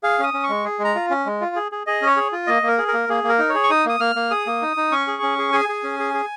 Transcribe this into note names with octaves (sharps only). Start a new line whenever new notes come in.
G#4 F5
C#4 D#6
C#4
C#6
G#3
G#4
G#3
A#5
F4
C#4
G#3
F4
G#4
G#4
G#4 D#5
C#4 C#5
G#4
F4
A#3 D#5
A#3
A#4
G#4
A#4
A#3
A#3 G#4
A#3
A#4
D#4
C#5
G#4
C#6
D#4 D#6
A#3 D#6
A#3 F6
A#3
G#4 D#6
A#3
D#4
D#4
C#4 C#6
G#4
C#4
G#4
G#4 G#5
G#4
C#4
G#4
G#4